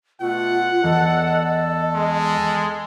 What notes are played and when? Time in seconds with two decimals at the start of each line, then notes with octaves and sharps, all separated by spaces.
0.21 B2 A3 F4 F#5
0.84 E2 A4 D#5
1.94 G#3